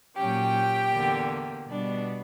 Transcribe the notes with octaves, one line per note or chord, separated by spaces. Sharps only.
A#2 F#3 C#4 G4 G5
E2 D3 A#3
B2 G3 B3 D4